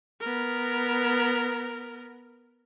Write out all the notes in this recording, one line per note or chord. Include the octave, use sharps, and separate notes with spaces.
B3 A#4